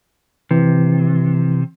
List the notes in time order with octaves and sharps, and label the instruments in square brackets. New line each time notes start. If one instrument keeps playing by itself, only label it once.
[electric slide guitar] C3 [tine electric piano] E3